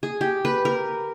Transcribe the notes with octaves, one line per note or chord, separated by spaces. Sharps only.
G#4
G4
B4
A#4